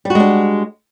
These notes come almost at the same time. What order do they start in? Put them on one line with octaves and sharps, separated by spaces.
G3 F#4 G#3 D4